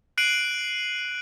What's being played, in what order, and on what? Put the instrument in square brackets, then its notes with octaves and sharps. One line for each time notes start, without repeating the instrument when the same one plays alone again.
[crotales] F#6 C7 D7 D#7 F#7